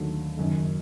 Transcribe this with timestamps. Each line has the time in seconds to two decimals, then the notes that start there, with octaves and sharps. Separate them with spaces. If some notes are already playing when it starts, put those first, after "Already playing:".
Already playing: D#2 D3 F#3 A3
0.37 F#1 F#2 D#3